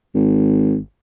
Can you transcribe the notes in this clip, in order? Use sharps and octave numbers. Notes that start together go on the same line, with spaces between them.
G#1